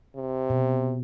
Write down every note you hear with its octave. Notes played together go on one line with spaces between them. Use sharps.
C3
B2